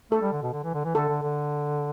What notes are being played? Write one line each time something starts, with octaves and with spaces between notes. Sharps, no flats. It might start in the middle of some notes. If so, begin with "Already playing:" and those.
A3 A4
G3
D3
B2
D3
E3
D3
E3
D3 A4
D3
D3